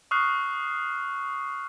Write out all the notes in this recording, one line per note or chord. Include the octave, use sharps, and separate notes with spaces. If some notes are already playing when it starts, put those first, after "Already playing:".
C#6 D#6 F6 F#6 C7